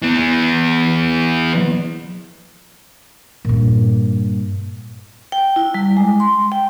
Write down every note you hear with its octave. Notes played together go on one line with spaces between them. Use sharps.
E3 B3
G2 A#2
G5
E4
G3
G#3
C6
G5